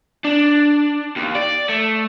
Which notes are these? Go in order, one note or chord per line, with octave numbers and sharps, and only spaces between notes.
D4
D#2
D5
A3